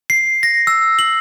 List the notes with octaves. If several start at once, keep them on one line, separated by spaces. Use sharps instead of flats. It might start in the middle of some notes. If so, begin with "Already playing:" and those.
C7
A#6
E6
F#7